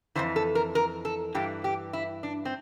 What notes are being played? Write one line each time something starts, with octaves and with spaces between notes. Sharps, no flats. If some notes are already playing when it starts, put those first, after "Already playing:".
F2 C3 E3 C5
A4
A#4
A#4
A4
G2 E3 G4
G4
E4
D4
C4